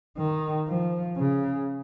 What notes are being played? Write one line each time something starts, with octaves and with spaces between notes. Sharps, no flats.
D#3
F3
C#3